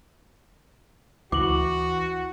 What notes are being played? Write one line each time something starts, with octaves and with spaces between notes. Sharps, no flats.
D2 E3 F#4 D6 F#7